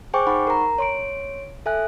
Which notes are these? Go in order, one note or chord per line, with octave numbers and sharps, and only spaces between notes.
G#4 C5 G5 G#5 C#6 D6
D#4 F#5 B5 C#6
A#4 A#5
C#5 C6 D7
A4 E5 G#5 F#6